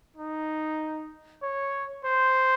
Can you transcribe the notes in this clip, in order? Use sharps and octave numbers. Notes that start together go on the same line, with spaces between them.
D#4
C#5
C5